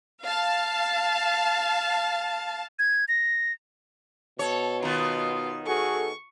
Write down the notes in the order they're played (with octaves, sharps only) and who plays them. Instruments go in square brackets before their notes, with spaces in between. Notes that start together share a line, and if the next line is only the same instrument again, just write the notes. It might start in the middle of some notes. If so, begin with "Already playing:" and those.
[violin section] F5 A5
[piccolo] G#6
A#6
[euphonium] B2 [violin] A4 [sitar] C#5
[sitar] D#3 B3 [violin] F4
[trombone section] F#4 G#4 A4 [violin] C#6